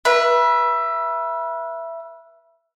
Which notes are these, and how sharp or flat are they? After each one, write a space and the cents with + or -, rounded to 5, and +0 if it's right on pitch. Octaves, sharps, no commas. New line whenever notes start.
B4 -30 E5 +15